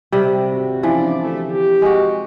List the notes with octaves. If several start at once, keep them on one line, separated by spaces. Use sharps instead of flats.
C3 G3
G#1 F#4
E3 F3 C#4 D4 D5
D2 C3 A3
G4
G#3 F#4